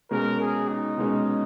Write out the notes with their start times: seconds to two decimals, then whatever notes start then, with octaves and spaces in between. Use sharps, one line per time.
0.11 B2 G#3 C#4 A#4
0.40 G#4
0.69 D#4
0.97 B2 G#3 C#4